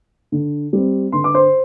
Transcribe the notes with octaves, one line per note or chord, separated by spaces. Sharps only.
D3
G3 C4
D3 C6
D6
C5 C6